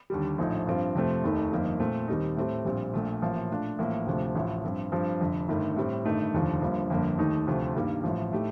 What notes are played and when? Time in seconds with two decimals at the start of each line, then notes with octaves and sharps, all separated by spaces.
0.10 D#2 D3 G3
0.38 A#1 A2 F3 A3 D#4
0.67 G2 F3 C4 F4
0.95 F2 C3 F3 A3 C4
1.23 F1 D#2 D#3 A3 D#4
1.52 G1 F2 D#3 A#3 D#4
1.80 A#2 A3 C4
2.08 D#2 D#3 G3 C4 D#4
2.36 A2 A3 C4 G4
2.65 A#1 A#2 G3 C4
2.93 A#1 A#2 A3
3.22 A1 A2 F3 A#3 F4
3.50 A#2 A3 D4 F4
3.79 A1 A2 F3 A#3
4.06 D2 C3 F3 A3
4.35 A1 A2 F3
4.64 G2 F3 C4
4.92 G2 F3 C4
5.20 F1 F2 D3
5.48 G1 G2 D#3 A3
5.76 A2 G3 C4
6.05 G1 G2 D#3 A3 D#4
6.33 F1 D#2 D3 F3
6.62 G1 G2 F3 A#3
6.90 G1 F2 D3 F3 A#3
7.18 D#2 D#3 A3 D#4
7.47 D2 C3 F3 A3
7.76 G2 D#3 G3 A#3
8.04 A1 A2 F3
8.32 A2 A3 D#4 G4